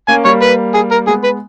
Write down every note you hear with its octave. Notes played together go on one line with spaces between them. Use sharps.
A#3 C#4 G#5
G3 A#3 C#5
B4
G#4
A#4
G#3 B3 G#4
B4